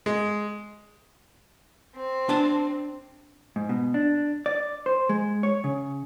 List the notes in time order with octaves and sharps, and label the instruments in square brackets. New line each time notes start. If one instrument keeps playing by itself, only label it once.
[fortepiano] G#3
[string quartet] C4
[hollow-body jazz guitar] D4 G#5 A5
G#2
B2
D4
D5
C5
G#3
C#5
C#3